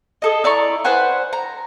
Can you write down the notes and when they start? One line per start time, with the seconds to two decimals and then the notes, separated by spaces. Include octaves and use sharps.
0.22 G#4 A4 D#5
0.44 E4 D5 A#5 C#6
0.85 B4 C5 F#5 G#5
1.33 A#5